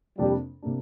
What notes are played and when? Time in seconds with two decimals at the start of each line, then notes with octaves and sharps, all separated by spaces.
0.18 F2 C3 G3 A#3 D4
0.62 C3 A#3 D4